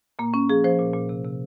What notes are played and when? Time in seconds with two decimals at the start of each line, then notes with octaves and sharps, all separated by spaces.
0.19 A#2 A#3
0.34 A#2 C#4
0.49 F3 G#4
0.64 F3 C5
0.79 A#2
0.94 A#2
1.09 C3
1.24 C3